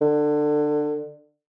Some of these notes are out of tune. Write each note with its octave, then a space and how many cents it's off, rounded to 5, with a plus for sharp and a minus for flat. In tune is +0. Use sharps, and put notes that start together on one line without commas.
D3 +25